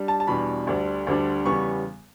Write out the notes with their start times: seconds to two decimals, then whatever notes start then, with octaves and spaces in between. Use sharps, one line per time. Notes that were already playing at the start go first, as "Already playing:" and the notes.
Already playing: G3 D4
0.08 A5
0.20 A5
0.27 E2 B2 G3 D4 B5
0.67 D2 D3 G3 D4
1.07 D2 D3 G3 D4
1.45 E2 C#3 G3 B3 C#6